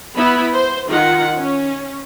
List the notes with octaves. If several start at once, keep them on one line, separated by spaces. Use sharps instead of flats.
B3 E4 B5
C5
D#3 F4 F#5
C#4